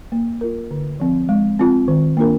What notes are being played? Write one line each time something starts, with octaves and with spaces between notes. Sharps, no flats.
A#3
F4 A#4
D3
F3 C4
G#3
C4 F4
D#3
A#3 D4 F4 A#4